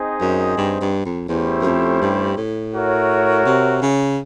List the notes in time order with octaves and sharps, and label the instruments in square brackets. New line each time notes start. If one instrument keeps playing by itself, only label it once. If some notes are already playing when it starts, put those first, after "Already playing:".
Already playing: [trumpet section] C4 D#4 G#4 C5 D#5
[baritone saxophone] F#2
G2
G2
F2
[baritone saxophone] E2 [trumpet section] A3 C#4 E4 G4 C5
[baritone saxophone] F#2
F2
G2
A2
[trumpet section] F#4 A#4 C#5 E5
[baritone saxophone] C3
C#3